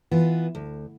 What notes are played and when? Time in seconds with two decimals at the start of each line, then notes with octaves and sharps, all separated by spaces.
0.11 E3 B3 F4
0.55 D2